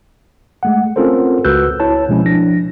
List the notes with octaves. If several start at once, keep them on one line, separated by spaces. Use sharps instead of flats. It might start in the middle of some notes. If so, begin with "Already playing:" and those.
G#3 A3 F#5
C4 C#4 F4 A4 A#4 C5
C#2 F#4 B4 E6 F#6 G6
E4 C#5 A5
B2 F3 G#3 C#4 E4
F3 D4 A#6